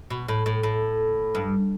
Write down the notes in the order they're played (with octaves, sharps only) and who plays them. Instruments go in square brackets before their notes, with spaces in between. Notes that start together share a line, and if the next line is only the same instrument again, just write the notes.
[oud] B2
A2
A2
A2
G2